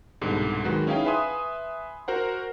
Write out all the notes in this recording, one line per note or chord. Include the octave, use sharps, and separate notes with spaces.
C2 G#2 B2 D3 G3
D#3 F#3 G#3 F#4 B4
C#4 D#4 E4 G#4 F5 G5
B4 E5 G#5 C6 D#6
F#4 A#4 C5 F#5